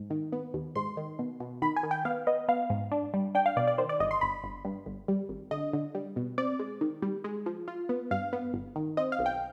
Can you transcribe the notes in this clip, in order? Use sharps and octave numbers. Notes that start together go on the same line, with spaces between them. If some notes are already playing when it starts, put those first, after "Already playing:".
Already playing: G#2
D#3
B3
D#2
G#2 C6
D#3
B2
B2
D#3 B5
G#5
D#3
G5
B3 F5
B3 D#5
B3 F5
G#2
D4
G3
D4 G5
F5
B2 D5
D5
D#3 C5
D5
G1 D#5
C6
G1 B5
G1
G2
G1
G3
G#1
D3 D#5
D3
G3
B2
C4 D5
G#3
D#3
G3
G#3
F3
F4
B3
G2 F5
B3
G1
D#3
C4 D#5
F5
B1
G5